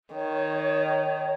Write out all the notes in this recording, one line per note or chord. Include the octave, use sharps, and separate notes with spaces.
D#3 C#5